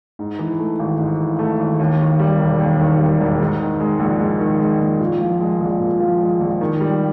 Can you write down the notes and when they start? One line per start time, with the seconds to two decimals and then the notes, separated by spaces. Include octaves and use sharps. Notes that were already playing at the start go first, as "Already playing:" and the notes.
0.19 G#2
0.39 E3
0.59 A3
0.79 G#1
0.99 G#2
1.19 E3
1.39 A3
1.59 G#1
1.79 D#2
2.00 D#3
2.20 G3
2.40 E1
2.60 D#2
2.79 D#3
3.00 G3
3.20 E1
3.40 G#2
3.60 D#3
3.80 G#3
4.00 A#1
4.20 G#2
4.40 D#3
4.60 G#3
4.81 A#1
5.00 A#2
5.20 F3
5.41 G#3
5.61 A#1
5.81 A#2
6.00 F3
6.21 G#3
6.40 A#1
6.61 D#3
6.80 G3